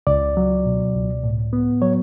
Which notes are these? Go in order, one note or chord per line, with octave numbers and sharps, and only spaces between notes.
C#2 D5
F#3
B2
C#2
A2
B3
F#3 C#5